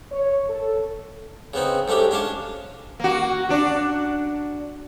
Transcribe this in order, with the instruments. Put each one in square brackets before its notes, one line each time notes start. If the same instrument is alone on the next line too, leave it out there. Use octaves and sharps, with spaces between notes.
[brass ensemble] C#5
A4
[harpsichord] C#3 B3 C4 D#4
G#2 A3 C#4 D4 G4
C#4 D4 F5 A5
[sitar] A#3 F#4
D4 F#4